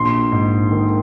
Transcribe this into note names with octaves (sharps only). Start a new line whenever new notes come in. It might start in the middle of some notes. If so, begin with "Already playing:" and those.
Already playing: A#1 C6
G#2
D#3